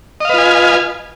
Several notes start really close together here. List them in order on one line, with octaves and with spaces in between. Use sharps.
D#5 F5 B4 F4 G#5